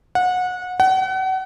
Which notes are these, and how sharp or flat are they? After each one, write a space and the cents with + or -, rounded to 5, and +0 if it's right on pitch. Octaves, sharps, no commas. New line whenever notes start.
F#5 -25
F#5 +35